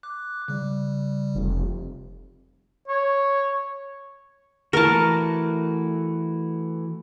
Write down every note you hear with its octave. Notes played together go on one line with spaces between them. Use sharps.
D6 F#6
C#3 G3
F1
C#5
E3 A3 F#4 A#4 A5